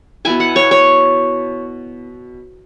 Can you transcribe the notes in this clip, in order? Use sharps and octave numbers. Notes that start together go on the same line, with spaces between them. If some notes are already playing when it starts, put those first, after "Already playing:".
B2 B3 E4 G#5
F#5
C#5
C#5